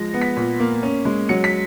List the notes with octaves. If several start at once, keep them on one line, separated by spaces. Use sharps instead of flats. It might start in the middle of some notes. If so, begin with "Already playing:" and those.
Already playing: F3 G#3 A#6
B3
B6
A#2
A#3
C#4
G#3
F#3 C#7
B6